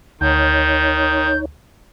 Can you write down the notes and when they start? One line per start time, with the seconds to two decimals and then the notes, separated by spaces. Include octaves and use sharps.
0.21 D2 D#3 D#4 C#5 G6